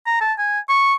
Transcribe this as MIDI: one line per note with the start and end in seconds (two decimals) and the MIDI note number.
0.06 0.16 82
0.21 0.33 81
0.38 0.59 80
0.69 0.94 85